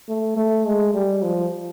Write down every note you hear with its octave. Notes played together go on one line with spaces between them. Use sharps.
A3
A3
G#3
G3
F3